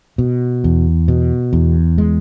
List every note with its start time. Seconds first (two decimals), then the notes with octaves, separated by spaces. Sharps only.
0.18 B2
0.64 E2
1.08 B2
1.53 E2
1.98 G#3